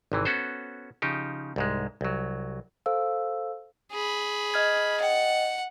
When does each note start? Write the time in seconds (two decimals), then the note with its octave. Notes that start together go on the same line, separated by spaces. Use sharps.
0.12 G#1 C3 E3
0.25 B3 C#4 F#4 A4 C5
1.02 C#3 F3 D#4 G4
1.56 C2 G#2 G#3
2.01 C2 F#3
2.86 A4 C5 F5 E6
3.92 G#4 B5
4.54 D#5 F6 G#6
5.00 D#5 F#5 G5